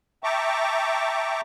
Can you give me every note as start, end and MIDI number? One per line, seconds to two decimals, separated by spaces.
0.24 1.41 76
0.24 1.41 79
0.24 1.41 81
0.24 1.41 82
0.24 1.41 85
0.24 1.41 86